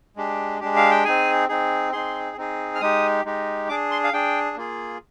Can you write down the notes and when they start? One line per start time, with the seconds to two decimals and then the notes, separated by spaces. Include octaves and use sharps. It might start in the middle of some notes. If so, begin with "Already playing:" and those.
0.16 G#3 D4 G4
0.60 G#3 D4 G4
0.77 F5
0.91 G5
1.04 C4 D#4 G#4 G#5
1.49 C4 D#4 G#4
1.93 C4 D#4 G#4 C6
2.37 C4 D#4 G#4
2.75 F6
2.80 G#3 D#4 G4 D#6
3.25 G#3 D#4 G4
3.69 D4 G#4 D6
3.91 C6
4.04 F5
4.13 D4 G#4 G5
4.57 A#3 F4 G#4